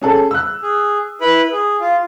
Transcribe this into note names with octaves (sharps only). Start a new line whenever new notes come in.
C#4 G#4 A4
E6 F#6
G#4
E4 B4 B5
G#4
F4